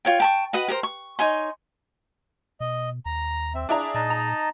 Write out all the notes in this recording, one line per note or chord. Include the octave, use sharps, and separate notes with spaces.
F4 C#5 G5
G5 A5 C#6
F#4 B4 D#5 F#5
G4 A#4 C5
C#6
D#4 C#5 G#5 C6
B2 D#5
D#2 A#5
C4 E5
D4 E4 G#4 A#5
A#2 D#4 D#5 A5
A#5